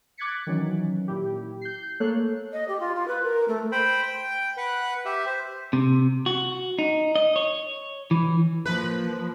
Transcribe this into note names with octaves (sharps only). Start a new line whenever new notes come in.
D6 F#6 G#6 A6 B6 C#7
D#3 E3 F#3 C#4
A#2 E4 G4
G6 C7
A3 A#3 A4 C#5 F#6
D#5
G4
F4
F4
B4
A#4
A3
C5 G5 B5
G5
B4 F#5
G4 E5
C5
C3
F#4
D#4
D#5
C#5
E3
F3 A#3 B4